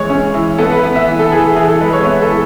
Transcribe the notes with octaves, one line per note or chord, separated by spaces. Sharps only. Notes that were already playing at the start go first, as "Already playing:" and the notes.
Already playing: E3 G#3 C#5
C#4
E3
B3 A4
B4
B3
E5
E3
A4
E3 G#4
G#4
E3 G#4
A4
G#3 B4
C#5
B3 E5
A4
E3